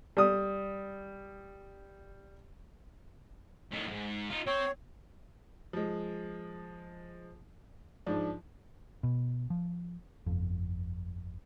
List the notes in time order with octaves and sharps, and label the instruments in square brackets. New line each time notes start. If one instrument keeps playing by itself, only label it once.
[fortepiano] G3 D#6
[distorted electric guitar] A2 D#3
F2 G#2
D#4 F4
[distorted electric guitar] C4 [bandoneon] C#5
[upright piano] F3 G#3
G#2 F3 D4
[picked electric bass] B2
F3
G1 F2